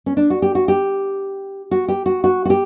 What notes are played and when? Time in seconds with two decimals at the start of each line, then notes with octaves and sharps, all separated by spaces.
0.06 C#4
0.17 D4
0.30 F#4
0.42 G4
0.55 F#4
0.68 G4
1.71 F#4
1.88 G4
2.06 F#4
2.24 F#4
2.45 F#4
2.50 G4